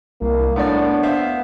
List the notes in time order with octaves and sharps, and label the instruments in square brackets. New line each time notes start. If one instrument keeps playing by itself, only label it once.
[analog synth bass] C2 [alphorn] A#3
[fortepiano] A2 A3 D5 [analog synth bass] B3 [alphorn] D4
[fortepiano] C5 E5 F5